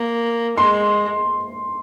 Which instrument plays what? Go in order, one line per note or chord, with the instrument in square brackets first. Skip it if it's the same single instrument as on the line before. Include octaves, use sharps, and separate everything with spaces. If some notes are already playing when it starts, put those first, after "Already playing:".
Already playing: [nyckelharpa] A#3
[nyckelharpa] G#3 [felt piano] C6